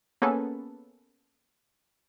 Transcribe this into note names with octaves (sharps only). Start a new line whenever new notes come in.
A#3 B3 C#4 G#4 A4 B4